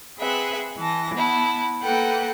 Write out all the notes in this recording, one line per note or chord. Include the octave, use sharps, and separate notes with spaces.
C4 G#4 B4 E5 F#5
E3 A5 A#6
B3 E4 A5
A#3 A4 B4 F#5 G5